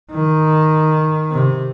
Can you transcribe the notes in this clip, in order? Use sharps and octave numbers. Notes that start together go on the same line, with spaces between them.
D#3
C3